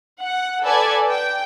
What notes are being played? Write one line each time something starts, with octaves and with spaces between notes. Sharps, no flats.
F#5
A4 B4 D5 G#5
G5